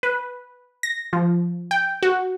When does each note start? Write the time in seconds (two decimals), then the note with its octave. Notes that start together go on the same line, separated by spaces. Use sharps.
0.03 B4
0.83 A#6
1.13 F3
1.71 G5
2.03 F#4